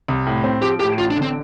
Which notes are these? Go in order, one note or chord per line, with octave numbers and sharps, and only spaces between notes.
C2
A2
C4
F3 G4
A2 G4
A1 F4
D4
D3
C4